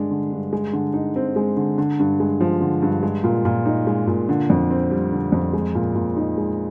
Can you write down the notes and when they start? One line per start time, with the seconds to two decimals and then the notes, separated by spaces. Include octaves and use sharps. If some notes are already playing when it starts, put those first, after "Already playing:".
Already playing: G2 D3 G#3 D4
0.11 D3
0.32 G2
0.53 G#3
0.73 D3
0.94 D#4
1.16 C4
1.36 G#3
1.57 D3
1.78 D3
1.99 G2
2.20 G#3
2.40 F3
2.61 D3
2.82 G2
3.03 G#3
3.24 A#2
3.45 A#2
3.66 D#4
3.87 G#3
4.07 A#2
4.29 D3
4.50 F2
4.70 C4
4.91 G3
5.12 D3
5.32 F2
5.53 G#3
5.75 A#2
5.95 A#2
6.17 D#4
6.38 G#3